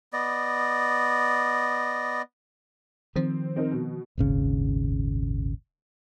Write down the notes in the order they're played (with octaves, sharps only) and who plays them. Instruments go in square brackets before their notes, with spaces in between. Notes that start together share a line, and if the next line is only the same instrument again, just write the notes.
[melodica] B3 D5 D#5
[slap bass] D#3 F3 [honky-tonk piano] C4
[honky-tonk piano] C4 D#4 A#4
B2
[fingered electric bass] D#1 G#1 C#3